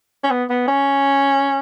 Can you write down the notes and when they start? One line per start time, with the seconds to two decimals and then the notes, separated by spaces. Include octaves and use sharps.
0.24 C#4
0.30 B3
0.50 B3
0.68 C#4